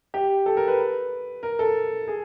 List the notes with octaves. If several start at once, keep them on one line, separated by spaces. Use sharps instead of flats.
G4
A4
A#4
B4
A#4
A4
G#4